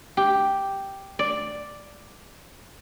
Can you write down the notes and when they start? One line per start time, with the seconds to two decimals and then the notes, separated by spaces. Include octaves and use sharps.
0.17 G4
1.19 D5